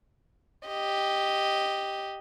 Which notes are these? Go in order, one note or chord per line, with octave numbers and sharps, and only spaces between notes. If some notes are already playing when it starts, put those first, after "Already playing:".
G4 D#5